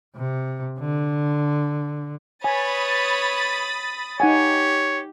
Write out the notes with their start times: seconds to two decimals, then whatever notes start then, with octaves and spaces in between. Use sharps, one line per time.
0.17 C3
0.79 D3
2.44 B4 C#5 G#5 B5 D#6 A6
4.20 D#4 G4 C#5 F#5 G#5